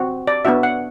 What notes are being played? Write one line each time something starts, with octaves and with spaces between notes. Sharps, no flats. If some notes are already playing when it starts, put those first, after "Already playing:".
Already playing: C4 F#4
D5
B3 D4 F#4 E5
F#5